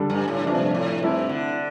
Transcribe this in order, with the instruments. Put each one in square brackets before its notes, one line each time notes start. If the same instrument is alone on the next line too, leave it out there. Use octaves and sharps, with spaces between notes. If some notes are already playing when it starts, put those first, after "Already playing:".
Already playing: [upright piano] D3 G3 D4 A4
[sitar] G2
A2
[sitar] G2 [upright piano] C3 F3 A3 D4
[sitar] A2
[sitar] G2 [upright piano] A3 C4 E4 A4
[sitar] D3